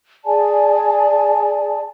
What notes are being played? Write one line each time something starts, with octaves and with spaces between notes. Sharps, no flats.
G#4 D5 G#5 A5